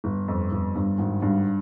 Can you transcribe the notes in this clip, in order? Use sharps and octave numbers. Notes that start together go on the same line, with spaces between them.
G1
F2
G1
G2
G#1
G2